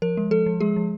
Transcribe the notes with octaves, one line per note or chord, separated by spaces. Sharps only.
F3 A#4
G#3
F3 A4
F3
G#3 G#4
F3